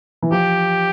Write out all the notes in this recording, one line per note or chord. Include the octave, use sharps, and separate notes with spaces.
E3
F3 G4